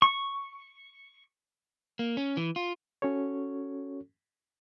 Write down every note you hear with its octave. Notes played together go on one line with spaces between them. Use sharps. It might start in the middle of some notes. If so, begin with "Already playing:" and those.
C#6
A#3
C#4
E3
F4
C#4 F#4 A4 C#5